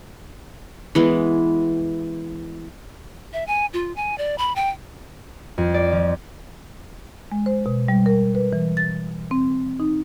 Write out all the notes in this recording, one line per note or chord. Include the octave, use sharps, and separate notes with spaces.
E3 G#3 B3
E5
G#5
F4
G#5
D5
B5
G5
F2
D5
F3
G#3
C5
B2
G3
A#4
B4
E3
A6
C4
D#4